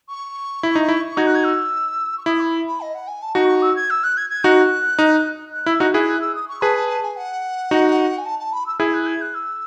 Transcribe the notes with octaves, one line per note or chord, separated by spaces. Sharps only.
C#6
E4
D#4
E4
D#4 F#4 G#6
F#6
G#6
E6
C#6
E4 D#6
B5
B5
D#5
F#5
G#5
A5
D#4 F#4 C#6
C#6
E6
G#6
E6
F#6
G#6
G#6
D#4 F#4 F#6
D#4
F#6
E4 E6
D#4 F#4 F#6
E4 G#4 F#6
F#6
E6
D#6
C#6
G#4 B4 A5
A5
A5
G#5
F#5
D#4 F#4
G#5
A5
A5
B5
E6
E4 G#4 G#6
F#6
G#6
F#6
E6